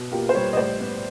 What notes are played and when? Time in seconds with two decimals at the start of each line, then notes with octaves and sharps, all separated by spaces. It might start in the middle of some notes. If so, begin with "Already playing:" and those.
Already playing: B2
0.12 A#3 F4 G4
0.29 C5
0.34 G3 B4 C#5
0.53 D#5
0.57 A2 C5 D5
0.80 B3